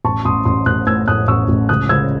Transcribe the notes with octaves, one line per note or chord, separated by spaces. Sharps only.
A1 A5 C#6
A1 C6 D#6
A1 C6 D#6
A1 D#6 F#6
A2 E6 G#6
A2 D#6 F#6
A1 C#6 E6
A1
C#2 D#6 F#6
C#2 E6 G#6